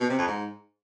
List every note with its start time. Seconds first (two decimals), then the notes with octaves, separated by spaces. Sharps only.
0.01 B2
0.09 C3
0.18 F2
0.27 G#2